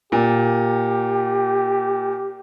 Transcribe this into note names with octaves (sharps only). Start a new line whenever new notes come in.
A#2 G4